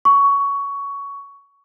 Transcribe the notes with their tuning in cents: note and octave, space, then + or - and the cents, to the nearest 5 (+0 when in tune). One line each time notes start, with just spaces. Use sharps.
C#6 +15